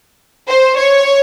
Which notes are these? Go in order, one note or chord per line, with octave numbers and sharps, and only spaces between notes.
C5
C#5